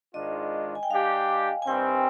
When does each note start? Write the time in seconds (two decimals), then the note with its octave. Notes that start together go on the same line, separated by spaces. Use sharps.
0.14 G#2 D#3 G#3 D4 F4 D#5
0.75 G#5
0.83 G5
0.90 G3 D4 G4 F5
1.62 G#5
1.67 G2 D#3 G3 C4 G5